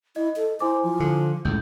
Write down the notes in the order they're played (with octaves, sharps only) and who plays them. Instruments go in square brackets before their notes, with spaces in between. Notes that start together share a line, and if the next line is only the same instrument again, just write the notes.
[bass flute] E4 [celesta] D#5
[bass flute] A4
[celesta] E4 G#5 D6 [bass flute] C5
[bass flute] F3
[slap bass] D3
[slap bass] C#2 A2 [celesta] G6